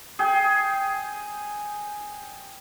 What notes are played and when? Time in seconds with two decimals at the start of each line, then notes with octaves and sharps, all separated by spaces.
0.19 G#4 G5